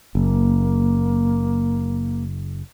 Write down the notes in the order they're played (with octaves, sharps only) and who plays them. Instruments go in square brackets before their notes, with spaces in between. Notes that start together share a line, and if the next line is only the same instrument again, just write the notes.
[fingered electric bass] F#1 [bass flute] A#3